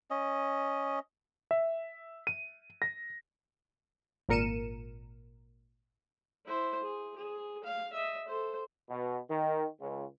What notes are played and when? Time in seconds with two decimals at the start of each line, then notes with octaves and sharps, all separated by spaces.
0.10 C#4 D#5
1.51 E5
2.27 D#7
2.82 A#6
4.29 G#1 A#2 A#4 C#7 D#7 E7
6.45 E4 C5
6.82 G#4
7.16 G#4
7.64 F5
7.93 D#5 E5
8.27 A4 C5
8.89 B2
9.29 D#3
9.80 C#2